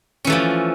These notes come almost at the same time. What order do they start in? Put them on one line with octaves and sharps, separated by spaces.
C#4 E3 A3 F3